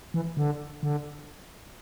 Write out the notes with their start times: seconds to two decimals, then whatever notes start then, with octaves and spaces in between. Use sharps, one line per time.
0.14 E3
0.37 D3
0.83 D3